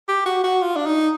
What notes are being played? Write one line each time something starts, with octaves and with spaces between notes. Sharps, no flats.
G4
F#4
F#4
F4
D4
D#4